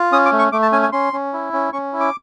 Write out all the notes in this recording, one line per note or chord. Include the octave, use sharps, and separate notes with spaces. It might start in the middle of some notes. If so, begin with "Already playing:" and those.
Already playing: F4
C#4 D#6
D6
A3
C#6
A3 D6
A5
C#4 G#5
G#5
C#4 C6
C#4
E4
C#4
C#4 C#6
E4
D6